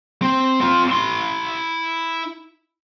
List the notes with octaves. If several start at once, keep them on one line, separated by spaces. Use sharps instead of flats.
C4
C4 F4
E4 C6